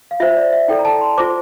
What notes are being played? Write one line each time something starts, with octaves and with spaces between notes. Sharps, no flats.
F5
F4 C5 E5
D5
E5
E4 A4 D5 G5
A#5
A5
C6
F4 C5 D6